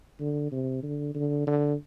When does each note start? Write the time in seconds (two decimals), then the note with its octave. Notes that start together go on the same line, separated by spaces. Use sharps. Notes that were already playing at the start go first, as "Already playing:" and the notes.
0.20 D3
0.52 C3
0.83 D3
1.15 D3
1.47 D3